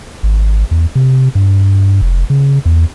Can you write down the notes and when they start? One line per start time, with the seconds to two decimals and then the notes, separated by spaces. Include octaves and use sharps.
0.23 G#1
0.71 E2
0.95 C3
1.35 G2
2.01 F1
2.30 C#3
2.65 E2